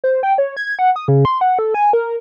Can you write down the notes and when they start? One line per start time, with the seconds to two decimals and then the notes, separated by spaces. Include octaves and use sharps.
0.04 C5
0.23 G5
0.38 C#5
0.57 G#6
0.79 F#5
0.96 D#6
1.08 C#3
1.25 C6
1.41 F#5
1.59 A4
1.74 G#5
1.93 A#4